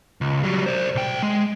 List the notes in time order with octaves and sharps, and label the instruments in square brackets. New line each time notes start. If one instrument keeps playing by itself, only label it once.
[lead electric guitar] C#2
F#3 G3
C5 D5
B1 G5
G#3